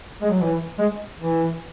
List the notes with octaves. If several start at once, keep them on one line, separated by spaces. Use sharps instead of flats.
G#3
F#3
E3
G#3
E3